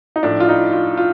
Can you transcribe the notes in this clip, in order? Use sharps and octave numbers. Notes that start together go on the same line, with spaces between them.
D#4
A2 F3 D4
F4
D#4
F4
F4